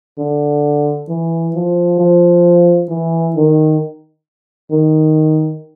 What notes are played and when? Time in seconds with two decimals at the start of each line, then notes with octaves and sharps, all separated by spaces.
0.18 D3
1.09 E3
1.55 F3
1.99 F3
2.89 E3
3.36 D#3
4.71 D#3